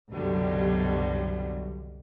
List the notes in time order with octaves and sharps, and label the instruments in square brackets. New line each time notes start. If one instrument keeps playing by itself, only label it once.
[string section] C2 F#2 B2 D3 F#3 G3